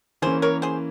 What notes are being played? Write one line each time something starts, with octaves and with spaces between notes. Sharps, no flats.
E3 A#3 C#4 G#4 C5
A#4 C#5
G#4 C5